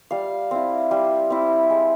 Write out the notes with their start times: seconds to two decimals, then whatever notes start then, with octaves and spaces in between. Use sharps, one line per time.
0.11 G3 F5
0.51 C4 E4
0.91 G3
1.30 C4 E4
1.70 G#3